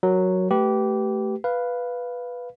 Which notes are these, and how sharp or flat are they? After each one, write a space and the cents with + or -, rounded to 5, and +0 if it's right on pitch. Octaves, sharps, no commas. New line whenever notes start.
F#3 +0 A#4 +0
A3 +0 G4 -20 B4 -5
B4 +0 F5 +0